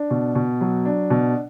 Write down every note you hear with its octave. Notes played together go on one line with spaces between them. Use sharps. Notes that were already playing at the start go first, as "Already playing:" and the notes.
Already playing: D4
B2
B2
F#3
D4
B2